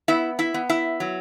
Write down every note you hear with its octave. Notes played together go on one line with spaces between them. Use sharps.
B3 E4 E5
E4 E5
B3
E4 E5
F#3